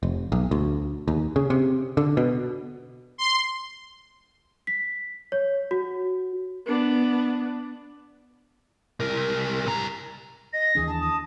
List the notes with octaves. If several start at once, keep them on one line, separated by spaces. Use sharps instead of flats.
F1
B1
D2
D#2
C#3
C3
D3
B2
C6
B6
C#5
F#4
B3 D4
C2 A#4
G2 A#5
D#5 A#6
D#2 E3 D4 G#4
A5
D#6